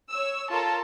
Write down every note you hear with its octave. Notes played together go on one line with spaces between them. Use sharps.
C#5 E6
F4 A4 A#4 C#5 A5